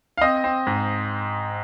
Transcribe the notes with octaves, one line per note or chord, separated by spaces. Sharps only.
F5
C4 D#5
C4
G#2